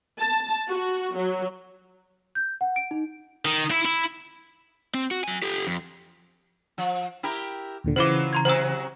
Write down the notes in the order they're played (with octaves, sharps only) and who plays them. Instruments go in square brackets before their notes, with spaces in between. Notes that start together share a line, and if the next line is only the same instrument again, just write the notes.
[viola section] A5
F#4
F#3
[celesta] G6
F#5
D7
D#4
[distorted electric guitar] D#3
E4
E4
[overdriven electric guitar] C4
F#4
F#3 G#5
G4 A4
F2
[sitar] F3
E4 G4 A#4
[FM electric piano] D#2 A#2 D3
[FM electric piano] C#3 E3 [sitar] F#3 E4 F4 [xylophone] C5 D6
[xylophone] A#5 C6 G#6
[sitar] C3 F#3 [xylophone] C5 E6